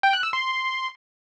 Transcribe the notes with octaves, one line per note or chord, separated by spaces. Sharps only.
G5
F#6
E6
C6